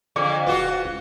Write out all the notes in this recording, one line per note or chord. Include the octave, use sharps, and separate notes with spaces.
F2 D3 G#4 D5 D6
D#1 F4 F#4 G#4 B4
C#2